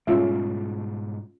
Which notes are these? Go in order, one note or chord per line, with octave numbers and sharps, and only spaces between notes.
G#2 B2 G3 C#4 F4 E5